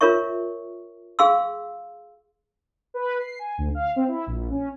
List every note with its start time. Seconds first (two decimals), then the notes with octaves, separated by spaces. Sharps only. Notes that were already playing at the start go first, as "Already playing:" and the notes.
0.01 F4 A#4 C#5 E5 C#6
1.19 G#4 F5 C6 E6
2.94 B4
3.20 C7
3.39 G#5
3.58 D2
3.75 F5
3.96 C4
4.08 E4
4.27 A#1
4.51 C#4